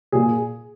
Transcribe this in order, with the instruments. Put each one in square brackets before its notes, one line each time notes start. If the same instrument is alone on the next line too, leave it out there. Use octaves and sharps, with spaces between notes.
[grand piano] A#2 G#4